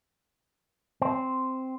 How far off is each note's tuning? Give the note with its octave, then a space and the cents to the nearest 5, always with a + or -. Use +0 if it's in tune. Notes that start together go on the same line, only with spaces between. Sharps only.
C4 -5